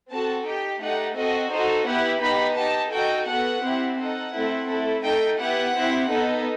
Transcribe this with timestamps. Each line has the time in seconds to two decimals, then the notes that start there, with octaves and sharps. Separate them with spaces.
0.10 C4 F#4 A4 A5
0.45 D#4 G4 G5
0.80 A3 D#4 G4 F#5
1.16 C4 F#4 A4 D#5
1.51 D#4 F#4 A4 C5
1.86 B3 E4 G4 F#5
2.21 B3 D#4 G4 B5
2.57 D#4 G4 A5
2.91 D#4 F#4 A4 G5
3.27 B3 F#4 A4 F#5
3.63 C4 E4 G4
3.97 D#4 A4 F#5
4.33 A3 C4 E4 A4
4.69 A3 E4 A4
5.03 A3 D#4 A4 G5
5.38 B3 E4 G4 F#5
5.74 C4 E4 G4
6.09 B3 D#4 A4